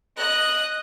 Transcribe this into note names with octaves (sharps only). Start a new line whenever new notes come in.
D#5 F#6